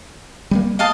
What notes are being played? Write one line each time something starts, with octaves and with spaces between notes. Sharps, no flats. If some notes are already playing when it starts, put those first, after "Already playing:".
G3 G#3 A#3
D#5 F5 A5